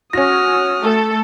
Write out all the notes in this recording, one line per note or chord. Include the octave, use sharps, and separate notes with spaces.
C#4 F#4 D#6 F6 A#6
A3 A4